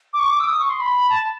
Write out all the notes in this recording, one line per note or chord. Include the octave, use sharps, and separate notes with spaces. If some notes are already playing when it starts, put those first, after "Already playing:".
D6
C#6
D6
E6
D#6
C#6
C6
B5
A5